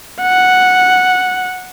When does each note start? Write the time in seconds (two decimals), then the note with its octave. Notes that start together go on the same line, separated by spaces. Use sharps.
0.22 F#5